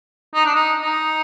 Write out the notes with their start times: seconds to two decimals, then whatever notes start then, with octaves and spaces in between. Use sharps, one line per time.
0.34 D#4
0.45 D4
0.55 D#4
0.82 D#4